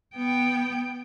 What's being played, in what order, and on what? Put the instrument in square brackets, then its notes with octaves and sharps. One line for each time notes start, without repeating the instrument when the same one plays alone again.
[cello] B3 G5